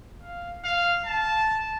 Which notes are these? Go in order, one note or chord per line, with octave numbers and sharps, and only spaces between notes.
F5
F5
A5